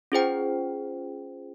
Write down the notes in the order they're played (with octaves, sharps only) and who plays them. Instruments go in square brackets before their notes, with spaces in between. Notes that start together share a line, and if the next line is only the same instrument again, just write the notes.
[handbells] C#4 F4 G#4 C5 G5